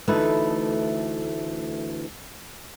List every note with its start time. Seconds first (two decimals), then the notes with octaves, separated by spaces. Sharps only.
0.08 D2 E3 A3 D#4 B4